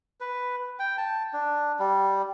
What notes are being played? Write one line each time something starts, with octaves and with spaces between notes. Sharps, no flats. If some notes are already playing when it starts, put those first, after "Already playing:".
B4
G5
A5
D4
G3